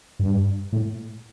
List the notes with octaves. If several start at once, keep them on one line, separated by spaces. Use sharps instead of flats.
G2
A2